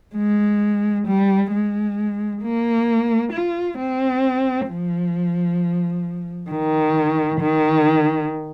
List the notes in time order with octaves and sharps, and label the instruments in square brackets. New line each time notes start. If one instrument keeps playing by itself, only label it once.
[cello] G#3
G3
G#3
A#3
F4
C4
F3
D#3
D#3